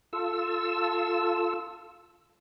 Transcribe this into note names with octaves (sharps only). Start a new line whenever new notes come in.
F4 A4 E6